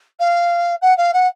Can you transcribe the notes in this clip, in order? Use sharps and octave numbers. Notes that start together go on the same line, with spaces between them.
F5
F#5
F5
F#5